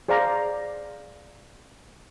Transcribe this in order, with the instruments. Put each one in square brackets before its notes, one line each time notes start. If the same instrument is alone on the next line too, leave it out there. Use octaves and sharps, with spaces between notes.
[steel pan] G#4 C5 D5 F5 A#5